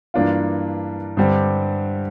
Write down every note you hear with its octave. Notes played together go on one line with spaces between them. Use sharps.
G2 E3 A#3 D4 F4
G2 D3 G3 C4 G4